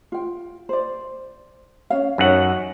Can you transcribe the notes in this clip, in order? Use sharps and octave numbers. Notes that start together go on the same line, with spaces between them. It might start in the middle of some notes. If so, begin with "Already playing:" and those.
F4 G5
C5 D5
C#4 C#5 F5
F#2 D#4 C#5 F#5